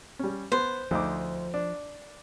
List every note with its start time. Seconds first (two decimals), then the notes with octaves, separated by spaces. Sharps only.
0.19 G3 C#4
0.52 B3 C5
0.91 D2 F3 D#4 D6
1.54 D4